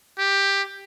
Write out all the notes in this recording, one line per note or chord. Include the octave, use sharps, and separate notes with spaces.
G4